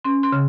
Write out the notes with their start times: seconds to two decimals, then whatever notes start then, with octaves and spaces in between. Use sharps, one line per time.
0.04 C#4 C6
0.23 C6
0.32 C#3